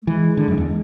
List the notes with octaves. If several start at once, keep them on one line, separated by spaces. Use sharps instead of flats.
A3
E3 G#3
D3
F#2
E2
G#3